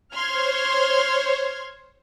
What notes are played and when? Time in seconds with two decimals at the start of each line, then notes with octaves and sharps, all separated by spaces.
0.15 C5 C#5 C6 F6 G#6